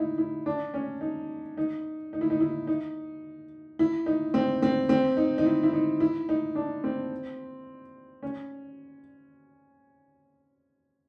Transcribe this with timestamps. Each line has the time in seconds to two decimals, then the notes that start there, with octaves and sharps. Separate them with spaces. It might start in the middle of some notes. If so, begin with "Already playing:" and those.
Already playing: D#4 E4
0.18 E4
0.46 D4
0.74 C#4
1.01 D#4
1.57 D#4
2.13 D#4
2.21 E4
2.30 D#4
2.40 E4
2.67 D#4
3.79 E4
4.06 D#4
4.34 C4
4.62 C4
4.89 C4
5.17 D#4
5.38 D#4
5.46 E4
5.63 E4
5.73 D#4
6.00 E4
6.29 D#4
6.55 D4
6.84 C4
8.23 C#4